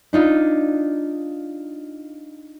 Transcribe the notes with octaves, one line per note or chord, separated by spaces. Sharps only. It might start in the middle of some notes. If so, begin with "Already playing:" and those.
D4 D#4 F4